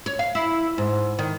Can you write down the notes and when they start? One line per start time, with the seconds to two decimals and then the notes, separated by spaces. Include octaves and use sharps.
0.06 C#5
0.19 F5
0.35 E4
0.78 G#2
1.19 D#3